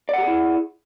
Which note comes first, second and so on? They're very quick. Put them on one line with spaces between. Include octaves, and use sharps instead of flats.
D5 F#5 G4 G#4 E4